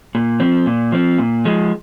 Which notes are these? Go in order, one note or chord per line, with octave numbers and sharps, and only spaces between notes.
A#2
F3 C4
A#2
F3 C4
A#2
F3 G#3